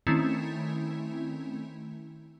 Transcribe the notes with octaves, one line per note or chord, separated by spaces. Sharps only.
D#3 A3 C4 C#4 E4